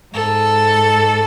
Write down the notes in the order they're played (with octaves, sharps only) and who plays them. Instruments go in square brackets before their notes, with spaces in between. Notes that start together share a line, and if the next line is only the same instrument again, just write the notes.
[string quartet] G#2 A4